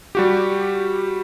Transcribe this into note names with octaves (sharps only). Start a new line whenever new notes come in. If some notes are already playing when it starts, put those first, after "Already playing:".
G3 F#4 G4